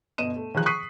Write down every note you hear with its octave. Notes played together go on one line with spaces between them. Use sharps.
G1 B2 D#5 D#7 E7
A3
D#3 F3 G#4 F#6
C#6 D#6 F#6 B6 C7 D#7